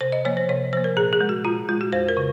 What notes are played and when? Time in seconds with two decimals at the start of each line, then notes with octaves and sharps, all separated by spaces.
0.01 C3 C5
0.12 D#5
0.25 F3 A#3 C#5
0.37 C5
0.49 C3 C#5
0.73 F3 A#3 C5
0.84 A#4
0.97 A#2 G#4
1.13 G#4
1.21 G#3
1.29 F#4
1.45 A#2 F4
1.69 G#3 F4
1.81 F#4
1.93 F2 C5
2.09 A#4
2.17 C#3